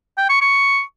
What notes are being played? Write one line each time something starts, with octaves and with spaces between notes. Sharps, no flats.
G5
C#6
C#6